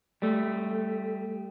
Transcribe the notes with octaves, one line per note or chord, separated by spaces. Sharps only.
G3 A3